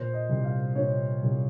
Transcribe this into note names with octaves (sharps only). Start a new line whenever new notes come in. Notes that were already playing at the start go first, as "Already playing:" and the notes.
Already playing: A#2 C5
D#5
C2
F5
A#2 C#5
C2